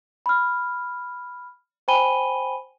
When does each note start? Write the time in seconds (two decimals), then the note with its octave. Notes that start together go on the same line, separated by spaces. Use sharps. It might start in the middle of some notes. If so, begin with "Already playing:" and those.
0.26 B5 F6
1.88 C5 G5 G#5 B5 D#7 G7